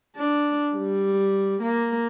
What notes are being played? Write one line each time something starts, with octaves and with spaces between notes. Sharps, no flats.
D4
G3
A#3